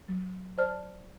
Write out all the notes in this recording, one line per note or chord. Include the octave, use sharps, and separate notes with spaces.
F#3
C5 D5 A5 F6